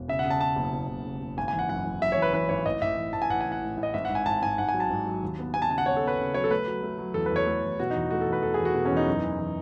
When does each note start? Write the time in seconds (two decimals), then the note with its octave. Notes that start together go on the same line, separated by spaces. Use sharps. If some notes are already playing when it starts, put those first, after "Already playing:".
Already playing: E1
0.08 C#3 E5
0.19 F#5
0.25 C#3
0.30 A5
0.40 C#3 A5
0.56 F#1
0.73 F#1
0.89 F#1
1.05 C#3
1.21 F#1
1.37 G#1 G#5
1.48 E3 G#5
1.59 F#5
1.69 F#2 F#5
1.85 G#1
2.02 F#2 E5
2.12 E3 C#5
2.22 B4
2.33 E3 B4
2.49 G#1 C#5
2.66 A1 D#5
2.82 A1 E5
2.97 A1
3.13 A1 A5
3.22 G#5
3.30 A1 F#5
3.41 G#5
3.46 A1
3.52 F#5
3.62 A2
3.77 A2
3.83 D#5
3.94 G#1 E5
4.05 G#2 F#5
4.15 G#5
4.26 G#1 A5
4.42 G#2 G#5
4.58 G#2 F#5
4.69 G#5
4.74 F#3
4.80 A5
4.90 G#2
5.06 F#3
5.23 D#2
5.39 B3
5.54 B3 G#5
5.62 A5
5.70 C#3 G#5
5.78 F#5
5.86 B3 C#5
5.97 A4
6.02 B3
6.07 B4
6.19 C#3
6.34 F#3 C#5
6.44 A4
6.50 A3 B4
6.67 F#3
6.83 A3
6.98 F#3
7.14 E2 A4
7.26 E2 B4
7.36 C#5
7.47 A3 A4
7.64 E2
7.79 B2 F#4
7.90 E2 D#4
8.11 A3 F#4
8.21 A4
8.27 E2
8.33 B4
8.43 E2 A4
8.54 G#4
8.60 E2
8.65 F#4
8.75 B2
8.85 C#4
8.91 E2
8.97 D#4
9.07 F#2
9.23 E3
9.40 E3